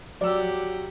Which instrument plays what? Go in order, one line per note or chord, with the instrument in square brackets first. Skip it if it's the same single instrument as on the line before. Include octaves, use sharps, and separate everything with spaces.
[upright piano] F#3 E6 [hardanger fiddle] G4 F#5 [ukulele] D5